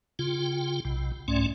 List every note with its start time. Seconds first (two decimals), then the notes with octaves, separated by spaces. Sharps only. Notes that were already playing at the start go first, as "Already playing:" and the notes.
0.19 C#3 F4 G5
0.85 B1 C3
1.28 C2 G#2 A3 C#4 D5